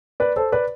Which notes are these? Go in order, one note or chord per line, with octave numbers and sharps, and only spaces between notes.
B4 D5
A4 C5
B4 D5